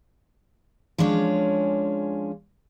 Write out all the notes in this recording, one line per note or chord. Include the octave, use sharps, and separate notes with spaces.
F3 G#3 C#4 D4 C#5